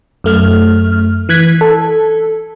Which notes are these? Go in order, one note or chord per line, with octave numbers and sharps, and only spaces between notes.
F#2 A3 F6
E3 F#6 G#6 B6
A4